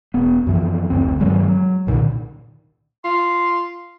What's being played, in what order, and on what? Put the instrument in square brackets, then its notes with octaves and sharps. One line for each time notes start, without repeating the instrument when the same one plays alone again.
[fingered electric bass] E1 B3
F#2 E3 F3
F#1 D2 C4
G2 D#3 F#3 G#3
F#3
C2 A#2 D3 D#3
[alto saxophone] F4 [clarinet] C6